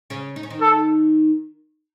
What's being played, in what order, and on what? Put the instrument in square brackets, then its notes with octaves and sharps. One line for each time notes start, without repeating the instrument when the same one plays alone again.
[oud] C#3 C#4
D#4
C#4
D#3 D#4
[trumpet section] A4